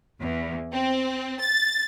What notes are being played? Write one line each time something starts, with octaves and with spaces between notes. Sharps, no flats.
E2
C4
A6